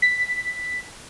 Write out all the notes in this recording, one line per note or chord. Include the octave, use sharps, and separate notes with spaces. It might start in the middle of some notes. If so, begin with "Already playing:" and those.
B6